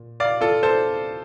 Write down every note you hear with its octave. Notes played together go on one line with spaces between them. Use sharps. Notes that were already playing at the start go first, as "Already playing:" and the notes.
Already playing: A#2
D5 F5
F4 A4
A4 C5